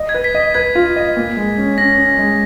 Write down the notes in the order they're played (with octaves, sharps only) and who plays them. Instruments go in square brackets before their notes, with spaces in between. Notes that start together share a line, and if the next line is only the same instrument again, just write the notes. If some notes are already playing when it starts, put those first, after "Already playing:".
Already playing: [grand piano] D#5
[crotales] G#6
[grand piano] B4
[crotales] B6
[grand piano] D#5
[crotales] B6
[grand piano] B4 [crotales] G#6
[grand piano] F4
D#5
A#2
G#3
C#4
[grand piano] C#4 [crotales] A#6
[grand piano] C#4
G#3